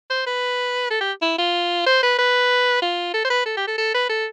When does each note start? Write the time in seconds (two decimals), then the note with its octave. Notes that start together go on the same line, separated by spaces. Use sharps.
0.10 C5
0.27 B4
0.90 A4
1.01 G4
1.22 E4
1.38 F4
1.86 C5
2.02 B4
2.18 B4
2.82 F4
3.14 A4
3.25 C5
3.30 B4
3.46 A4
3.57 G4
3.67 A4
3.78 A4
3.94 B4
4.09 A4